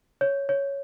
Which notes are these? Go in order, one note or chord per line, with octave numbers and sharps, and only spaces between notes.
C#5
C#5